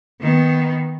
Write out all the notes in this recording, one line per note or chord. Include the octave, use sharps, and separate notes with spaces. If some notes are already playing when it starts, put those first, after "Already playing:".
D#3 B3